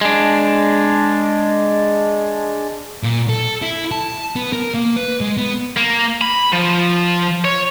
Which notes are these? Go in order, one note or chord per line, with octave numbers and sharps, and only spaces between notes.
G#3 D4
A#2
A4
E4
A5
B3
A#4
A#3
B4
G#3
B3
A#3
B5
F3
C#5